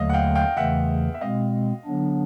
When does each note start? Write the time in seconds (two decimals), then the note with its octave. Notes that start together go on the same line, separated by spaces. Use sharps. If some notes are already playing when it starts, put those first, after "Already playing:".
Already playing: D#2 D3 F#3 A3 D#5 F5
0.09 F#5
0.13 F5 G5
0.35 F5 G5
0.57 E2 C#3 E3 A3 E5 F#5
1.14 E5
1.21 B2 G#3 C4 D#5 F5
1.85 D3 F#3 B3 D4